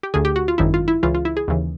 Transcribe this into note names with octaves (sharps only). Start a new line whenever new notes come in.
G4
D2 D3 G#4
G4
F#4
F4
G#1 F#2 D#3 E4
F4
E4
C#2 C#3 E3 F4
F4
E4
G#4
D#2 C#3 E3